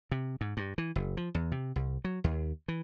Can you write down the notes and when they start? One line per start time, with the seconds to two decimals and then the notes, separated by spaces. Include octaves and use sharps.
0.11 C3
0.41 G#2
0.57 G2
0.78 E3
0.96 F#1
1.17 F3
1.35 E2
1.52 C3
1.76 C2
2.04 F#3
2.24 D#2
2.68 E3